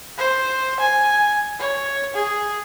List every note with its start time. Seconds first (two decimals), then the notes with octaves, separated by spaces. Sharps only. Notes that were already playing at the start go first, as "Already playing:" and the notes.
0.18 C5
0.79 G#5
1.59 C#5
2.14 G#4